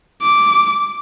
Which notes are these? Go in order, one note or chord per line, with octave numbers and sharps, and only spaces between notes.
D6